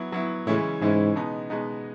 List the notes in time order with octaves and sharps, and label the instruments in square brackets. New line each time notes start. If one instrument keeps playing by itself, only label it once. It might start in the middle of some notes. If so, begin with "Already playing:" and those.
Already playing: [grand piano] F#3 B3 E4
F#3 B3 E4
[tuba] A2 [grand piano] C#3 E3 G#3 C#4 E4
[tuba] G#2 [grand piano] C#3 E3 G#3 C#4 E4
[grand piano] B2 G#3 B3 D#4
B2 G#3 B3 D#4